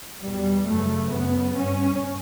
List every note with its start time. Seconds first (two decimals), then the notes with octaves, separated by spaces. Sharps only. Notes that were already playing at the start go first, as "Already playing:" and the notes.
0.22 E2 B2 G3
0.67 F#2 C#3 A3
1.10 F#2 C#3 B3
1.54 G2 C#4